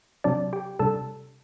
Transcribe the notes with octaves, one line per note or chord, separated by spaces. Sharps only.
C3 F#3 C4 D4 D5
G4 G5
C3 G3 D4 A4 A5